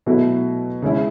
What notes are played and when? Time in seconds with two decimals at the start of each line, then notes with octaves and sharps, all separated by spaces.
0.06 B2 F#3 A3 E4
0.82 C#3 G#3 C#4 E4